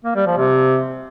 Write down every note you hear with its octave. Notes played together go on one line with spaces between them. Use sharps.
A#3
G3
F3
C3